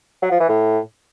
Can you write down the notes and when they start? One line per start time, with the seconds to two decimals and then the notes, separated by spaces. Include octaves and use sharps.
0.22 F#3
0.31 F3
0.40 E3
0.49 A2